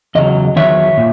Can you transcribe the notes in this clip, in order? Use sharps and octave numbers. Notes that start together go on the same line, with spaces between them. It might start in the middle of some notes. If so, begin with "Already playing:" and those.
E2 C#3 F#3 D#5
E2 D#3 F#3 C#5 E5
A#2